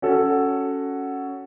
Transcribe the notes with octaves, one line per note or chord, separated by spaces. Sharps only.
C#4 F#4 A4